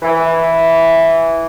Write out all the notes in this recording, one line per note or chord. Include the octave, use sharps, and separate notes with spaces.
E3